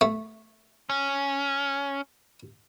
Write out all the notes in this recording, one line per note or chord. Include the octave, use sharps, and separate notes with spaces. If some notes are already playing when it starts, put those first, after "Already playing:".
A3
C#4